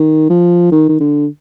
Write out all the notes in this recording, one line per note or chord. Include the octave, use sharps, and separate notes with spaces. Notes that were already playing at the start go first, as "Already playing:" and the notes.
Already playing: D#3
F3
D#3
D#3
D3